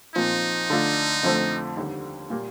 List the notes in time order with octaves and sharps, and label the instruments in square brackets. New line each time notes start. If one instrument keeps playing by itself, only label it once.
[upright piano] A#2 F3 C4 F4 [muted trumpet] D#4
[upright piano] D3 A3 D4 F4
F2 D3 F3 A3 C4
D#2 D3 G3
A#2 G3 A#3